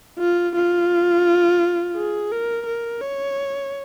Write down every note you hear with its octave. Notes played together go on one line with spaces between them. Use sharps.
F4
F4
G#4
A#4
A#4
C#5